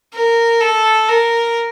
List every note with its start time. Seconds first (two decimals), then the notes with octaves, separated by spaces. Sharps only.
0.14 A#4
0.61 A4
1.08 A#4